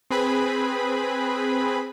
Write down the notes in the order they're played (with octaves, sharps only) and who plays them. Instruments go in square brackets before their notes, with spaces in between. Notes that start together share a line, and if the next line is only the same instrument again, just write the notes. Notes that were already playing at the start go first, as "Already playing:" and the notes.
[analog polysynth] C4 G#4 B4 B5